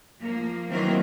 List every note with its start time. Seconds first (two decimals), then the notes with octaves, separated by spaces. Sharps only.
0.22 F3 A#3
0.70 D#3 E3 F#3 A#3 C4 A#4